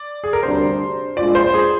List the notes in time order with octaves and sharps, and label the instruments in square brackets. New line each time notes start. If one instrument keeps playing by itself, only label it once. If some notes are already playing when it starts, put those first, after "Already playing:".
Already playing: [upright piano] D5
G#4
A#4
[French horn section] D2 C3 G3 D4 [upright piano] C5
[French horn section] A#2 G#3 D4 F4 [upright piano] D5
[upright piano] C5
G#4